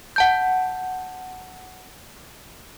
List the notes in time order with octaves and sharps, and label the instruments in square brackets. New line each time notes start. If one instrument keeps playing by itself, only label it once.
[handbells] F#5 A5 G6